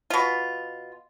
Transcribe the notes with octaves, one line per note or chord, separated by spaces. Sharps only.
B2 F4